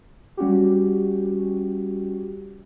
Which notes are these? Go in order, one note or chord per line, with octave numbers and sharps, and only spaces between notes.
G3 C#4 F#4 G4